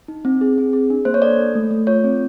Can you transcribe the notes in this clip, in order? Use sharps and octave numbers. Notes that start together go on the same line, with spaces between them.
D#4
C4
G#4
C4
G#4
D4
A#3 C5
C#5
A4 D5
A4
A3
A3
F4 C#5
C4